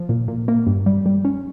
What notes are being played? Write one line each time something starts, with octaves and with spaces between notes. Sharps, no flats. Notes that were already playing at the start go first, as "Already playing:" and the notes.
Already playing: F3
A#2
A#2
A#3
G2
G3
G3
C#4